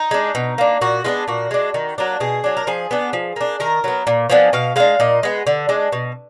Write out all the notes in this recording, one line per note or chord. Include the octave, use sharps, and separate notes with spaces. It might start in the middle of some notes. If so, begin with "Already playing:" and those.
Already playing: D#4
G#3 D4
B2
A#3 D4
A#2 F#4
G#3 B3 D4 F4
A#2 F#4
G#3 D4
D#3
F#3 A#3 D4
B2 G#4
F#3 D4
A#4
F3 G#4
B3 D4
F3
A#3 D4
D#3 A#4
F#3 B3
A#2
F3 B3 D4 G#5
B2 F5
G#3 D4 F5
A#2 D#5
G#3 B3
D3
G#3 D4
B2